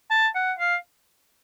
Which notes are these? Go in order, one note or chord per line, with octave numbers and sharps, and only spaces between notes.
A5
F#5
F5